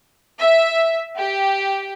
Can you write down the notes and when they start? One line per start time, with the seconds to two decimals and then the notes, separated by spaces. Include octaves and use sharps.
0.39 E5
1.18 G4